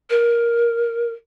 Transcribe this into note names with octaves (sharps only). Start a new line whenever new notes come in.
A#4